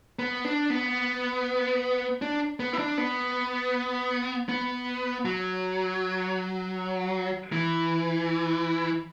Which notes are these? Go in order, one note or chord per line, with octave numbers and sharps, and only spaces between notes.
B3
D4
B3
D4
B3
E4
D4
B3
B3
F#3
E3